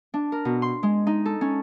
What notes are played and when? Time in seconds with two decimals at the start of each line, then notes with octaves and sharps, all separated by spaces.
0.14 D4
0.32 A#4
0.45 B2
0.62 C6
0.83 G#3
1.07 D#4
1.25 A4
1.41 C#4